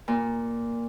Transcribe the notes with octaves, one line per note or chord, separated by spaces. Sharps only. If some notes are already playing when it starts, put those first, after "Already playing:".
A#2